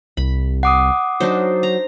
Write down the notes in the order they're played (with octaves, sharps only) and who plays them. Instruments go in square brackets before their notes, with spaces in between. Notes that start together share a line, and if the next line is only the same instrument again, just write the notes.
[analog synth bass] C2 [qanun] B5
[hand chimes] F#5 D6 D#6
[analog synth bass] F#3 [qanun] D4 D#4 C5
[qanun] A#5